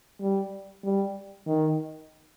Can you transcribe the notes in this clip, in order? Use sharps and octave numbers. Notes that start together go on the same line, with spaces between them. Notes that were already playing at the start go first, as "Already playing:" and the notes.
G3
G3
D#3